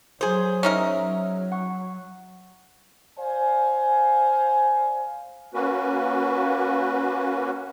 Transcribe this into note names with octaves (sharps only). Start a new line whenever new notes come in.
F#3 G#4 C5
C#4 D#4 A#4 C#5 E5
F#3
F#5 C#6
C5 D5 F5 G#5
A#3 C#4 F#4 B4